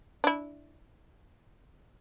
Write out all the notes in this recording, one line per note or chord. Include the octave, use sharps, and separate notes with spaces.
D4 E4